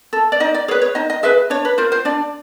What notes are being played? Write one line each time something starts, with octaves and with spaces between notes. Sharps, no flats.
A4
D5
D#4 D#5
D5
G#4 B4 C#5
C#5
D#4 D#5
D#5
G#4 B4 E5
D4 C#5
B4
F4 A#4 C5
C5
D4 D5